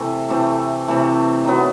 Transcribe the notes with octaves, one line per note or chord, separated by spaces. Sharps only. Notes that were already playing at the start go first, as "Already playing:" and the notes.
Already playing: C3 E3 A3
C3 E3 A3
C3 E3 A3
D#3 F#3 B3